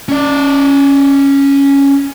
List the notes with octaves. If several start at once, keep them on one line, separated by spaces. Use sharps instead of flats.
C#4 D5